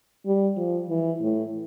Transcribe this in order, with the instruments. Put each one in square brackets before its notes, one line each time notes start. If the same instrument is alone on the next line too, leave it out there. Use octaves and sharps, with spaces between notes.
[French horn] G3
F3
E3
A2